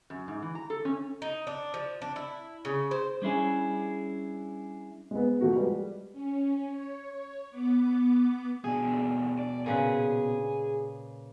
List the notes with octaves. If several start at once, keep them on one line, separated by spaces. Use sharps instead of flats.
F#2
G#2
E3
A#5
A4
C#4
D#4
D4
F3
D4
E4
C#3
C5
G3 C#4 D4 E4 G#4
G#3 B3
F3 A3 A#3 F#4
G3 G#3 B4
C#4
C#5
B3 D6
B2 D4 G#4
E2 D3
D5
A#2 C#3 G#4 B4